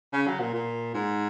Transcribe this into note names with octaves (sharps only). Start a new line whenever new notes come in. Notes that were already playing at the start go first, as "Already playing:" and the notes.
C#3
F#3
A#2
A#2
G#2